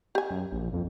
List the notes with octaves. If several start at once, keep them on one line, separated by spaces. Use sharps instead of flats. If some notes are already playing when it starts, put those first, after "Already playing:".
G4 G#5
F#2
A#1
F2